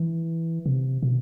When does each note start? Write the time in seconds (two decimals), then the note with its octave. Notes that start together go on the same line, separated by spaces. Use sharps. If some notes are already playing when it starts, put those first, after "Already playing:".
Already playing: E3
0.66 C3
1.03 B2